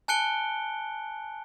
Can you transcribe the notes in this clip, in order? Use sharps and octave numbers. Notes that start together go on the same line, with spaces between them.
G#5 A5 F#6 C#7 D7 G7